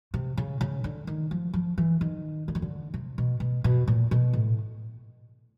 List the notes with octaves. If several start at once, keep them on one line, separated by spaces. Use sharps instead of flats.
C3
C#3
C#3
D3
D#3
F3
F3
E3
D#3
D3
D#3
D3
C3
B2
B2
B2
A#2
B2
A2